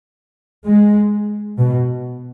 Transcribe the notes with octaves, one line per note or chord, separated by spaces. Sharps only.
G#3
B2